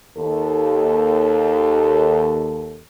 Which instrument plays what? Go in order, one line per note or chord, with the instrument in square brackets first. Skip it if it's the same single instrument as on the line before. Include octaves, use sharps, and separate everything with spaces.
[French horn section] D#2 A4